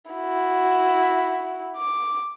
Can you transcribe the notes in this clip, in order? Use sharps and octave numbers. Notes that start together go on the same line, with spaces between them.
E4 F#4
D6